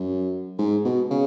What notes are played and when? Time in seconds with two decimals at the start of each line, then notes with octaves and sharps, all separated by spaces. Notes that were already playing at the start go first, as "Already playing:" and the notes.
Already playing: F#2
0.59 G#2
0.84 B2
1.10 C#3